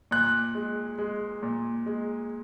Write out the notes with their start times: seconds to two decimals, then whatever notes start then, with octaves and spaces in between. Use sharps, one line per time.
0.11 A#2 F#6
0.55 G#3
0.98 G#3
1.43 A#2
1.86 G#3